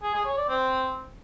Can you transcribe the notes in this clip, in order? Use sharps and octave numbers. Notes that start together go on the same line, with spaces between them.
G#4
G#4
C#5
D5
C4